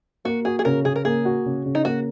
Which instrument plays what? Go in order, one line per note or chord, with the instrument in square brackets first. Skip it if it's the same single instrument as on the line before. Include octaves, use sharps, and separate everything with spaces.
[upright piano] A#3 [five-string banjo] F#4
[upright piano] F#4 [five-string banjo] G#4
[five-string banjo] G#4
[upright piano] C#3 [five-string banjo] A#4
[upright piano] C#3 [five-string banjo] G#4
[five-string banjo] A#4
[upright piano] A#3 [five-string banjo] G#4
[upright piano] F#4
C#3
C#3
[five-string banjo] D#4
[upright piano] A#3 [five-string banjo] F#4